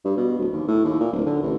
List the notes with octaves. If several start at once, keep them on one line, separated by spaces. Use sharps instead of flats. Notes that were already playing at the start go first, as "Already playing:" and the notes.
G2
B2
D1
D#2
A2
D#2
A#2
D1
D3
A1